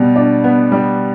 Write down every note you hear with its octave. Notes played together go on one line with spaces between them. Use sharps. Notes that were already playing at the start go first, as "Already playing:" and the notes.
Already playing: B2 G3
D4
B3
G3